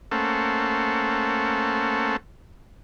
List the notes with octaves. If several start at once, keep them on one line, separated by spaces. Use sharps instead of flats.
A3 A#3 C#4 A4 C5 F#5